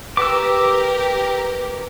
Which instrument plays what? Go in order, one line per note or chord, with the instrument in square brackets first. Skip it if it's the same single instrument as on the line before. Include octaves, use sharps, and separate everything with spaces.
[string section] G4 A#4 [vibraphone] B4 [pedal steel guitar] D6 E6